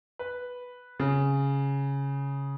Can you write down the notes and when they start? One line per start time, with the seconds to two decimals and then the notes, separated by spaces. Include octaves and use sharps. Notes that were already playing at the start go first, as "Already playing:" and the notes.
0.19 B4
1.00 C#3